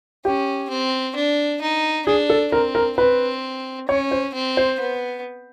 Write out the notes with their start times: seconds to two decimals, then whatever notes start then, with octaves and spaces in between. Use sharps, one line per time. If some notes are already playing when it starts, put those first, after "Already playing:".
0.25 C#4 G4
0.70 C4
1.15 D4
1.62 D#4
2.06 D4 G#4
2.30 A4
2.52 C4 A#4
2.75 A#4
2.97 C4 B4
3.88 C#4 C#5
4.11 C5
4.34 C4
4.57 C5
4.80 B3